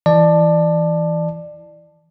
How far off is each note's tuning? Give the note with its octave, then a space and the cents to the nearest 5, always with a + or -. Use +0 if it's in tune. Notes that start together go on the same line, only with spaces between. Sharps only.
E3 +0 D5 +25 A5 +0